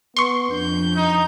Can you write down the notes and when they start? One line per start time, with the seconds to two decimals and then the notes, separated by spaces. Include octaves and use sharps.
0.17 B3 C6 C#6
0.51 F2 D4 G6
0.96 D#4